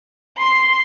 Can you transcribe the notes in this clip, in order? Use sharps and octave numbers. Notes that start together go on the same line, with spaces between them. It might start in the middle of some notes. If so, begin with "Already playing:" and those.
C6